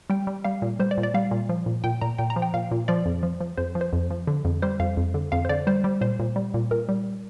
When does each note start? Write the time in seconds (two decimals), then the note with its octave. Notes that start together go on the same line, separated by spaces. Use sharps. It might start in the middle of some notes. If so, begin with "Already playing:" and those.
0.10 G3 G5
0.27 G3
0.44 G3 F5
0.62 A#2
0.80 G3 C5
0.91 D5
0.97 A#2
1.03 D5
1.14 G3 F5
1.31 A#2
1.49 F3
1.66 A#2
1.84 A#2 G5
2.01 A#2 A#5
2.18 A#2 G5
2.30 A#5
2.36 F3
2.42 G5
2.54 A#2 F5
2.71 A#2
2.88 F3 D5
3.06 F2
3.23 F3
3.41 F3
3.57 F2 C5
3.75 F3
3.81 C5
3.93 F2
4.10 F3
4.27 D3
4.45 F2
4.62 G3 C5
4.79 F2 F5
4.97 F2
5.14 D3
5.32 F2 F5
5.45 C5
5.49 D3 D5
5.67 G3 C5
5.84 G3
6.01 A#2 C5
6.19 A#2
6.36 G3
6.54 A#2
6.71 A#2 A#4
6.89 G3